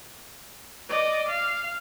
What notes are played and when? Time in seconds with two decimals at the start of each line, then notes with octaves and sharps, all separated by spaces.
0.89 D5 D#5
1.29 F5